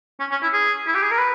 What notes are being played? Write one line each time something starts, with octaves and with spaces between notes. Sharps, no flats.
C#4
C#4
E4
G#4
E4
G4
G#4
A#4
B4